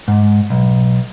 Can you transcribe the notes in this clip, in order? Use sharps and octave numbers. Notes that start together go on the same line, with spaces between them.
G#2
B1